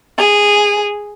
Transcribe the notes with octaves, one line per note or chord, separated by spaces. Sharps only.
G#4